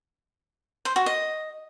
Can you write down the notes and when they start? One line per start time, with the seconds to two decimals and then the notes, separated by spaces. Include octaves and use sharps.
0.85 C5
0.96 F#4
1.06 D#5